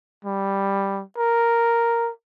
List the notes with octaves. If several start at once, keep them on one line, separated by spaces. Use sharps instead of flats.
G3
A#4